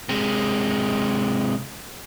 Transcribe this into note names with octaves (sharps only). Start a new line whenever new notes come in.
C3 G#3